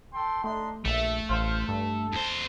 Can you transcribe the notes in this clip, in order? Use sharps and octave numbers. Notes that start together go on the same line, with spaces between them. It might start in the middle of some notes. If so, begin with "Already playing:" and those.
A4 G5 C6
A3 D4 D#4 C6
A#1 A3 E5
A1 C5 F5
G2 A4
E2 C5